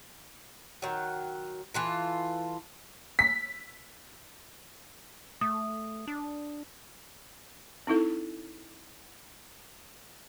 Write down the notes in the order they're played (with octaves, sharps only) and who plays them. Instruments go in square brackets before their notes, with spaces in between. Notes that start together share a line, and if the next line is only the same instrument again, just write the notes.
[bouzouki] D#3 F#3
E3 F4 A4
[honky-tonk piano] B6
[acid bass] A3 [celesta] D#6
[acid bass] D4
[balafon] C4 D#4 E4 A4